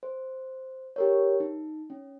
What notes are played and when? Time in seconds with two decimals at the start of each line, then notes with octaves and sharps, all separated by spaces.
0.03 C5
0.96 G4 A#4 C#5
1.40 D#4
1.90 C#4